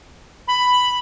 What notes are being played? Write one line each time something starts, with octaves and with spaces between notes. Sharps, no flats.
B5